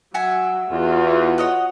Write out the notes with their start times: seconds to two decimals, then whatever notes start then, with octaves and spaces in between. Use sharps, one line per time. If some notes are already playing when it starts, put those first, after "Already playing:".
0.14 F#3 E5 F#5 G#5
0.70 E2 F4 F#4
1.38 C#5 D#5 F#5